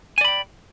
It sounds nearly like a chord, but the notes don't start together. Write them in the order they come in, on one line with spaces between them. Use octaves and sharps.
G#5 D5 B5 G5